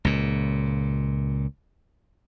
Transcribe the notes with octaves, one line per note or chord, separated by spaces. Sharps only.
C#2 A#2